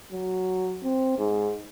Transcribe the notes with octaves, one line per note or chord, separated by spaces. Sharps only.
F#3
C4
G#2